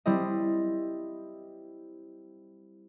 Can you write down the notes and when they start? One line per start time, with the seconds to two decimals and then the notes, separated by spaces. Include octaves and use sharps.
0.06 G3 C4 E4 D#5